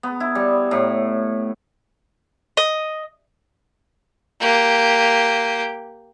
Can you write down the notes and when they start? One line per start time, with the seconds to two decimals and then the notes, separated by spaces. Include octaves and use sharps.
0.03 B3
0.20 E4
0.35 G3
0.71 A2
2.57 D#5
4.40 A#3 G4